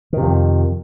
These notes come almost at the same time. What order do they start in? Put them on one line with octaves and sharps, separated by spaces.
D#3 C3 F2